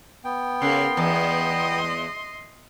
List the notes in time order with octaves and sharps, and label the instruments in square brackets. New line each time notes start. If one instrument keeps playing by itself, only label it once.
[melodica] B3 G5
[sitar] C#3 [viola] A#4 C6
[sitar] E2 [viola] D#5 C6